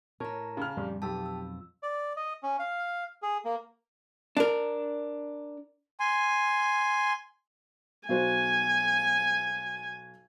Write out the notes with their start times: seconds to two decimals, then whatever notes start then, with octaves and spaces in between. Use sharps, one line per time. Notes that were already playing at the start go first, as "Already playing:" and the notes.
0.20 A2 A#4 C#5 A5 A#5
0.57 C#3 F6
0.77 F2 A2 D3 G3
1.02 B1 F2 F3 G4 A5 E6
1.26 E6
1.83 D5
2.16 D#5
2.43 C#4
2.59 F5
3.22 G#4
3.45 A#3
4.37 D4 A#4
6.00 G#5 C6
8.09 B1 F#4 C5 G#5